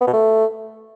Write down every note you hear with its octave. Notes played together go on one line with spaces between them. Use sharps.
B3
B2
A3